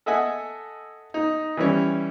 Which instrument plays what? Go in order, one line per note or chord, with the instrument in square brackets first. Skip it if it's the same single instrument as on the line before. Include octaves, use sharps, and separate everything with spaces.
[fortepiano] A4 D#5 E5 F#5 G#5
D#4
E3 G3 C#4